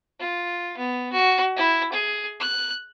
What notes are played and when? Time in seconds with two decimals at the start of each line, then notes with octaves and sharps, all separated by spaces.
0.20 F4
0.77 B3
1.13 F#4
1.56 E4
1.92 G#4
2.40 F#6